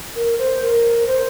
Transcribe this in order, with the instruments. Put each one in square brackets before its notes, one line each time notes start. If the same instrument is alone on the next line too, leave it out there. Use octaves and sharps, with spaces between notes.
[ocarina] A#4
C5
A#4
C5